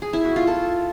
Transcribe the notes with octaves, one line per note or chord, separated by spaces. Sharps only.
G#4
E4
F#4
F4
A4